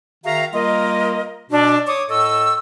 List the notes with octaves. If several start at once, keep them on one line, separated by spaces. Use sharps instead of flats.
D#3 F#4 G#4 E5 F5 A#5
G3 A#3 F4 A#4 D#5
B2 D4
C#5 D6 D#6
A2 A4 D#5 C#6 E6